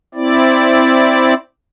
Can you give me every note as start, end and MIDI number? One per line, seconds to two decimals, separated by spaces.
0.15 1.34 60
0.15 1.34 64
0.15 1.34 74